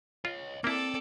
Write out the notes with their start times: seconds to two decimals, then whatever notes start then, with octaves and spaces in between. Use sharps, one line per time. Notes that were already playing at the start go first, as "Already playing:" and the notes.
0.25 F4 C#5 D#5
0.64 A#3 C4 E4 A4 D5